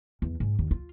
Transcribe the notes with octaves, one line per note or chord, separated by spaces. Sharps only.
E2
G#2
D#2
F4